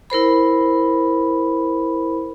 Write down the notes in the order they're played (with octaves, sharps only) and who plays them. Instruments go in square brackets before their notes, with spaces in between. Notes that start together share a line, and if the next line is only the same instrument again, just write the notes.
[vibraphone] E4 A#4 C5 B5